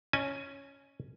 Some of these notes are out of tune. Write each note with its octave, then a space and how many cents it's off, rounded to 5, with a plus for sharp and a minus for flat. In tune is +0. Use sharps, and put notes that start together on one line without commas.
C#4 +0 D#5 -35 G#5 +10